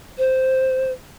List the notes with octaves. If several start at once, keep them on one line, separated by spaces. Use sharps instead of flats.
C5